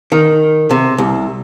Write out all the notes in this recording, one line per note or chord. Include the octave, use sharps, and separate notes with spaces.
D#3
C3
C2